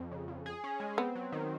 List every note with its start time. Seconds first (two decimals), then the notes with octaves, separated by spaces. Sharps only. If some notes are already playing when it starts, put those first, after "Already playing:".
Already playing: F2
0.11 C#3
0.28 F2
0.46 G#4
0.64 C#4
0.80 G#3
0.97 B3 C4
1.15 F#3
1.32 D#3